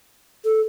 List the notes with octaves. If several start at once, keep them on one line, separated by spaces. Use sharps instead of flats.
A4